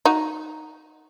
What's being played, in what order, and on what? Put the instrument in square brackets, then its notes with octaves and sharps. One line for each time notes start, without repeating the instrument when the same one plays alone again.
[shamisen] D#4 F#4